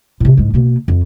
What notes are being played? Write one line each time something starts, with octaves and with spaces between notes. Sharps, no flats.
A2 C3
G#2 G#3
B2 A#3
F2